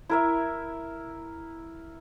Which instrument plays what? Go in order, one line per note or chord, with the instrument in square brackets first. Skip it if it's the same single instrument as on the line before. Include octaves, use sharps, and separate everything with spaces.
[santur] E4 A#4 E5